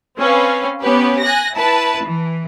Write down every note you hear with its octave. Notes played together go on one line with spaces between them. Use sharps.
C4 C#4 B4 F5
B3 C#4 G4 B4
G#5 F#6 A#6
E4 B4 A5
E3